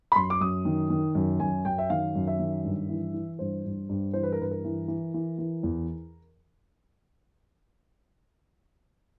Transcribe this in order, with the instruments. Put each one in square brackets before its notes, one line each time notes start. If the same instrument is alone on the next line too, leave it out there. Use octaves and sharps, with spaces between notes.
[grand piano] B5
F#2 C6
D6
F#2 D#6
D#3
D#3
F#2
F#2 G#5
F#2 G5
E5
D#3 F5
F#2
E5
D#3
G2
E3
E3
G2 C5
G2
G2
E3 C5
B4
A#4
G2 B4
A#4
E3
E3
E3
E3
E2